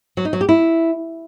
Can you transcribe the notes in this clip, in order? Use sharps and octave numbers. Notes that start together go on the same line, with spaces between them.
F#3
D#4
F#3
G4
E4